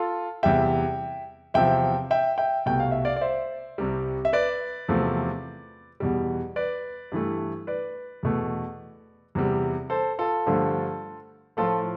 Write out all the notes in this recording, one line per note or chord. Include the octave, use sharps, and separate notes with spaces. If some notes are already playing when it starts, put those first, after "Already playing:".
Already playing: F4 A4
E2 C3 G3 E5 G5
E2 C3 F3 E5 G5
E5 G5
E5 G5
C2 B2 A3 G5
F5
E5
D5 F5
D5
C5 E5
C2 C3 G3
E5
B4 D5
E2 C3 F3 A3
E2 B2 G3
B4 D5
G2 E3 A3
B4 D5
E2 B2 A3
E2 C3 G3
A4 C5
F4 A4
G2 D3 F3 A3
A2 F3 A3 F4 A4